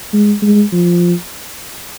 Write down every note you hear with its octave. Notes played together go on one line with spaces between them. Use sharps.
G#3
G#3
F3